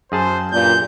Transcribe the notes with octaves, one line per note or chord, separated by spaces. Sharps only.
F#2 G#4 C5 A5
G2 A#2 G6